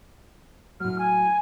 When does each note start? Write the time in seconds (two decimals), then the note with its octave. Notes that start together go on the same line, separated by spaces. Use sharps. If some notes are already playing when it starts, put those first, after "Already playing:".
0.80 A2 F#3 F6
0.98 G#5